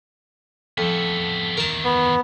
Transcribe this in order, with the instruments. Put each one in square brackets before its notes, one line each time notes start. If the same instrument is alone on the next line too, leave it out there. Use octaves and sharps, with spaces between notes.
[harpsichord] F2 [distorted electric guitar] B3 A4
[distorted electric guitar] E2 D#3 [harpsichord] A#4 A5
[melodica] B3